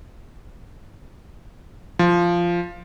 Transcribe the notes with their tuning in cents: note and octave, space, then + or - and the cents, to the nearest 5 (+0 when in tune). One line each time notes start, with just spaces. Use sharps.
F3 -10